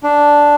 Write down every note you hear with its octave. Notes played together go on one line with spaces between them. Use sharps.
D4